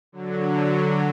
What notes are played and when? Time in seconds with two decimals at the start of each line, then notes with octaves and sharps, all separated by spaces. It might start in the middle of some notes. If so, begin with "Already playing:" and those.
0.12 D3 F#3